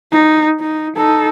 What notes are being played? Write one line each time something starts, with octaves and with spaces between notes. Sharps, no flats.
D#4
D#4
D#4 A4